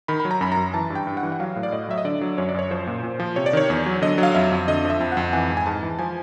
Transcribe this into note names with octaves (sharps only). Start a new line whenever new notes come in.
D#3 B5
B5
F#3
A#5
F#2 B5
A#5
F#2
E3 A5
G2
G5
G2
F#5
E3
F#5
F#3 F5
A2
D5
A2 D#5
F#3 E5
D#5
D3 D5
F#3
F#2 C#5
D5
F#2 C#5
F3 C5
A#2
A#2
F3
C3 C#5
D5
D#3 C#5
E2 D5
F#3
D3 D#5
F#3
F5
F2 E5
F2
D3 D#5
F3
E5
F2
F2 F#5
E3 G#5
G#2
G#5
G#2 A5
E3
F3 G#5